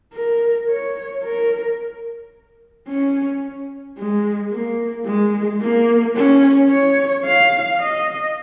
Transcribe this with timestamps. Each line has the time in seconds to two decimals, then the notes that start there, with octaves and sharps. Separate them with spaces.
0.13 A#4
0.69 C#5
1.24 A#4
2.88 C#4
3.97 G#3
4.52 A#3
5.06 G#3
5.61 A#3
6.16 C#4
6.70 C#5
7.25 F5
7.80 D#5